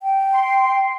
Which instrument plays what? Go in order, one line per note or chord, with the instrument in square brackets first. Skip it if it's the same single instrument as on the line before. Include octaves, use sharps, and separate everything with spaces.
[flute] G5
[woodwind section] C6